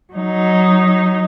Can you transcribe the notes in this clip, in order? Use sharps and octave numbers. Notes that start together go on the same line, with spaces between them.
F#3 D#4